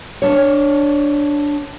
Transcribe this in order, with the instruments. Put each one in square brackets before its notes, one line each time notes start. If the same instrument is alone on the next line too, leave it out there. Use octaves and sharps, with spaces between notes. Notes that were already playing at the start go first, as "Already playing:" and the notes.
[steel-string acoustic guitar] D4 C#5